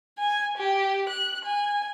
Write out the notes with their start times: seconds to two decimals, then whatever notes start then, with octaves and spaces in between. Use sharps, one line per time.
0.19 G#5
0.58 G4
1.09 F#6
1.45 G#5